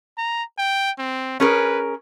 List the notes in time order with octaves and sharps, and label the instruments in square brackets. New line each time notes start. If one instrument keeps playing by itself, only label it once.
[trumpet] A#5
G5
C4
[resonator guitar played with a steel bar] C#4 G#4 A#4 [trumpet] B4